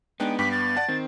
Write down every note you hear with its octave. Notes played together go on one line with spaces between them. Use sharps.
G#3 B3 D4 D#4 G5
G2 G5 D6 B6
A6
D5 F#5 A5
D#3 C4